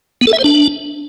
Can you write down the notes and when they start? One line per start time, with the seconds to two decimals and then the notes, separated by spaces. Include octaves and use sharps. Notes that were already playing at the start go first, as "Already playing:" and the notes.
0.21 B3
0.27 A4
0.33 E5
0.38 C5
0.44 D4